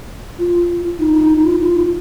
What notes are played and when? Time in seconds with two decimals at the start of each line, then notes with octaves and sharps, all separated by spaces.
0.39 F4
0.99 D#4
1.14 D#4
1.30 D#4
1.45 F4
1.61 F4